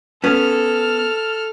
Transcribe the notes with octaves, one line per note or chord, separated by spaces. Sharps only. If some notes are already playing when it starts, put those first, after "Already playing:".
B3 C#4 A4 F6